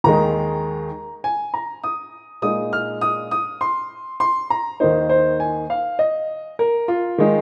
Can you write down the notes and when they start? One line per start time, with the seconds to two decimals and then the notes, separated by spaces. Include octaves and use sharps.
0.04 D#2 D#3 G#3 D#4 A#5
1.24 G#5
1.54 A#5
1.84 D#6
2.42 A#2 G#3 D#4 D#6
2.73 F6
3.01 D#6
3.31 D#6
3.61 C6
4.20 C6
4.50 A#5
4.80 D#2 D#3 A#3 D#4 C5
5.09 C5
5.40 G#5
5.70 F5
5.99 D#5
6.59 A#4
6.88 F4
7.18 D#3 G#3 D#4